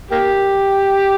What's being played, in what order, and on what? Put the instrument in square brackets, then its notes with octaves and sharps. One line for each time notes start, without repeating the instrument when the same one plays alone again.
[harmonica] A#3 G4